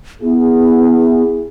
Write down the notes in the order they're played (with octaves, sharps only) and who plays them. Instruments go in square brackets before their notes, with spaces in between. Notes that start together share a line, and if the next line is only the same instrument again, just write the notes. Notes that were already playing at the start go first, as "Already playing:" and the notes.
[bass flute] B3 [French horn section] E4 G#4